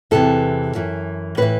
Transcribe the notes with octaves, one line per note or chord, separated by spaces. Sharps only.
E2 C3 E3 A4
F#2 E3
A2 E3 B4